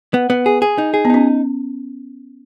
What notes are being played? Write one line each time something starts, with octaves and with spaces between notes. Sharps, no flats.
B3
B3
G#4
G#4
D#4
G#4
B3
C#4 D#4